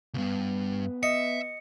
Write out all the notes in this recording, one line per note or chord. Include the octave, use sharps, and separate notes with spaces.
C#2 G2 B3
D#5 E5 C#7